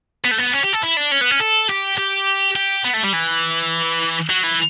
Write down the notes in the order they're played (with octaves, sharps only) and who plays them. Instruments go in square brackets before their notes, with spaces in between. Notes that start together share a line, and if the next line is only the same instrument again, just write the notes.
[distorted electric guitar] B3
A3
B3
C#4
G4
A4
E4
D4
C#4
B3
C#4
A4
G4
G4
G4
B3
A3
G3
E3
F#3
E3